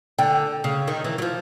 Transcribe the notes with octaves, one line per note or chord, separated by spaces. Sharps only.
D3 G5
C#3
D#3
E3
F#3
F3